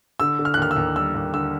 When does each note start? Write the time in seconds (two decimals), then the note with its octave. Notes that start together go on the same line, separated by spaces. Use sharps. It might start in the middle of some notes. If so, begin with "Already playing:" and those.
0.20 D3 E6
0.39 D3
0.45 F6
0.54 F#6
0.57 D#2 F6
0.71 E6
0.77 D#2
0.96 G3 E6
1.15 D#2
1.34 D3 E6